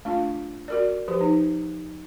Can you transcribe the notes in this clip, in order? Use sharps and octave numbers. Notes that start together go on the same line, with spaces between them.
A3 D4 F4
F#4 A#4 D5
F3 G4 B4
D#4